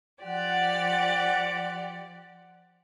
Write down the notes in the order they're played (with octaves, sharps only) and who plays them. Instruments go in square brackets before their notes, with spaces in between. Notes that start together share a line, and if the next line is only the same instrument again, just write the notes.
[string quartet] F3 G4 D5 [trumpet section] F#5